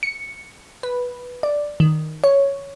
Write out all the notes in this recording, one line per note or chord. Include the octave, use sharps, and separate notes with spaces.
C#7
B4
D5
D#3
C#5